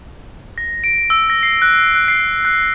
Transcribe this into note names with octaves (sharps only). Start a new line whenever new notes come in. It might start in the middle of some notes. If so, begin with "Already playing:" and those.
A#6
D7
E6
A#6
C7
F#6
F#6
C7
F#6